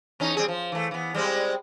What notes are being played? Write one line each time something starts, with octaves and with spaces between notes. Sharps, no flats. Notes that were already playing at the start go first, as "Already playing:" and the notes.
E2 C#4 D#4
G3 C4 G#4
F3
E3 A3
E3 B3
G3 G#3 C4